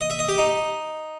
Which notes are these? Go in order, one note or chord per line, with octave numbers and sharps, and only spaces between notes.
D#5
E5
D#5
G4
D#4